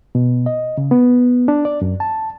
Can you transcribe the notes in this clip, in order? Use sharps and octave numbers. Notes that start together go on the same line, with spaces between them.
B2
D#5
C#3
B3
D4
D5
F#2
A5